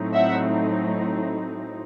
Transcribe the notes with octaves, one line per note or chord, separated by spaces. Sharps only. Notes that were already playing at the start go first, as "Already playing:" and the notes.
Already playing: A2 F#3 A3 C4 D#4
E5 F#5